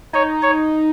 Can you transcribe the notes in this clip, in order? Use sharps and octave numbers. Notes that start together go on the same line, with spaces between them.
D#4 C#5
C#5